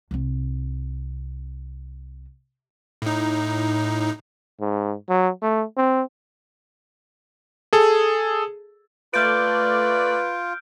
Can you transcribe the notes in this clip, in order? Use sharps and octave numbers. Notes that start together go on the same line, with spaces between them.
C2 C4
A2 D#4
G#2
F#3
A3
C4
G#4 A4
A3 F4 B4 D5 F6 G6 D7